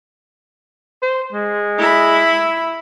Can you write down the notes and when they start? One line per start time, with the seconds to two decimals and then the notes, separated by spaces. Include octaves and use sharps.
1.03 C5
1.33 G#3
1.78 E4 B5